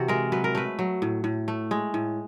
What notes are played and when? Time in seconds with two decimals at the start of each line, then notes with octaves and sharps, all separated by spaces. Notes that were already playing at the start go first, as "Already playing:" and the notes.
Already playing: C3 E3 F#4
0.08 G#3 A#4
0.32 F#3 B4
0.44 A#4
0.55 A3 B4
0.79 F#3
1.02 A2
1.24 A2
1.48 A3
1.71 G#3
1.94 A2